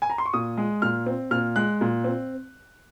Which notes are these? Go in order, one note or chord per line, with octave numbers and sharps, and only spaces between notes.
G#5
A#5
C6
C#6
A#2 D#6
G#3
A#2 F6
C4
A#2 F6
G#3 F#6
A#2
C4